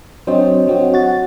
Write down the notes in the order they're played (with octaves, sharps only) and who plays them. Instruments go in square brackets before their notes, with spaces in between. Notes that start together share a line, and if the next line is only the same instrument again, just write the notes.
[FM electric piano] F#3 C4 C5 [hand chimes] D4 C#5 D#5
[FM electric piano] F#3 C4 F#4
F#4 A6